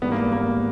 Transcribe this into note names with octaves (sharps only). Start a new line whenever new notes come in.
G#1 G#2 E3 G3 B3
A#3
A#3